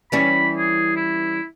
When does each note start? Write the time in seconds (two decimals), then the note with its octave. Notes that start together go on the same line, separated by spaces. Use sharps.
0.12 E3 G3 C#4 B5
0.57 G#4
0.96 E4